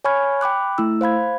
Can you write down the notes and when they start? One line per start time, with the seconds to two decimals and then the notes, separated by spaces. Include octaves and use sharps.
0.05 C#5 G#5 B5 C#6 F6 G#6
0.41 G5 B5 D6 F#6
0.78 A3 E4 E6
1.01 C5 F5 B5 G#6